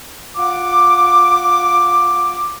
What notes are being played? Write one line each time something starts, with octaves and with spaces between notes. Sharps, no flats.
F4 F#5 D6